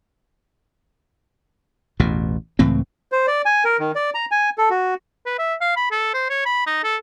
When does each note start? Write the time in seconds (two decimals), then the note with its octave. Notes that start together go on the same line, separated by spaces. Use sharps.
2.00 A1 E2 B2
2.59 C#2 A2 E3 C4
3.12 C5
3.27 D5
3.46 G#5
3.65 A#4
3.79 D#3
3.95 D5
4.15 A#5
4.31 G#5
4.58 A4
4.70 F#4
5.26 B4
5.39 E5
5.61 F5
5.77 B5
5.91 A4
6.14 C5
6.30 C#5
6.46 B5
6.66 D#4
6.84 A4